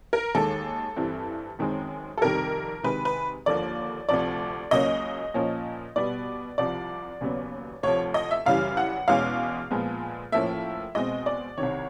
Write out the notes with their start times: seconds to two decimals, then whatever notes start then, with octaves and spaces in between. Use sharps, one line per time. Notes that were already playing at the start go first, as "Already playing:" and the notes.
0.13 A#4
0.35 D#2 D#3 G#3 A4
0.96 G2 E3 G3 C4
1.59 F#2 D#3 G#3 C4
2.18 A4
2.21 F2 C3 D#3 G3 A#4
2.83 C3 D#3 G#3 B4
3.05 B4
3.46 D#2 D3 F3 A#3 D5
4.09 D2 C3 F3 D5
4.71 C#2 C#3 F#3 A#3 C#4 D#5
5.34 A#2 F3 A#3 C#4
5.96 B2 G3 B3 D5
6.58 C2 C3 F3 D5
7.21 D#2 C#3 F#3 B3
7.83 D2 C3 F3 C#5
8.14 D#5
8.31 E5
8.46 F#2 C#3 E3 G3 F5
8.77 F#5
9.08 E2 B2 G#3 C#4 F5
9.71 A#2 F3 G#3 B3
10.32 A2 F3 A#3 C#4 E5
10.95 B2 G#3 C4 D#5
11.26 D5
11.58 C2 C3 D#3 C#5